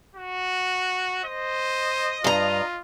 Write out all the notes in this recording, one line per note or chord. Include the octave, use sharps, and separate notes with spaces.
F#4
C5 D#5
G2 F4 A#5